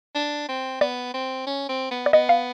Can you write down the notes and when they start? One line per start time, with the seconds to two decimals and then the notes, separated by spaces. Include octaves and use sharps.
0.16 D4
0.49 C4
0.81 B3 D5
1.14 C4
1.47 C#4
1.69 C4
1.91 B3
2.06 D5
2.13 B3 D#5
2.29 F5